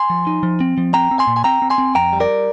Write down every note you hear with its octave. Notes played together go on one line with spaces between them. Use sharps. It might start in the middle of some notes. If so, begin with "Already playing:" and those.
Already playing: G#5 C6
F3
D#4
F3
C4
F3
C4 G5 A#5
C4
G#5 C6
A#2
G#5
C4 G5 A#5
C4
G#5 C6
C4
F2 G5 A#5
G3
A#4 D5